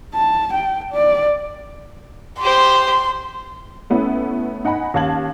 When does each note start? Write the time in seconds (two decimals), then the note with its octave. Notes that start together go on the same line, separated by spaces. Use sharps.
0.14 A5
0.53 G5
0.93 D5
2.41 G4 C5 C6
3.90 A3 B3 C#4 E4
4.65 D#4 F#5 G#5 B5
4.94 D#2 C#4 F5 A5 G#6 F#7